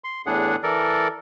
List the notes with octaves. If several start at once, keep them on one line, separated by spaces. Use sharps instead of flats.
C6
E2 A2 D4 G#4 F#5
E3 A4 A#4 D5